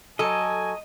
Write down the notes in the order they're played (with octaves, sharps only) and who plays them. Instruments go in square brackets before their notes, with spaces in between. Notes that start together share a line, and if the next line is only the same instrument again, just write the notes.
[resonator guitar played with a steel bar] F#3 A4 [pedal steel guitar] D#5 [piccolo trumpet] G#5